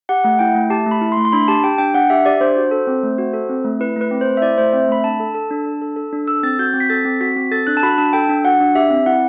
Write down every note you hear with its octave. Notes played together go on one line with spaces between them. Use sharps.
G4 F#5
A3 F#5
E4 G5
A3
G4 A5
A3 B5
E4
C6
A3
C6
D4 B5
G4 A5
G4 G5
D4 G5
D4 F#5
G4 E5
G4 D5
D4 C5
F#4
A4
C4
A3
F#4
A4
C4
A3
E4 B4
A3 B4
C4
C5
A3
E5
E4 D5
A3 C5
C4 E5
A3 B5
D4 A5
A4
A4
D4
D4
A4
A4
D4
A4 E6
C4 A6
F#4 G6
C4
B6
A4 A6
C4
F#4 B6
C4
A4 A6
D4 F#6
A5
F#4 B5
D4 A5
A4 G5
D4
F#4 F#5
D4
G4 E5
C4
E4 F#5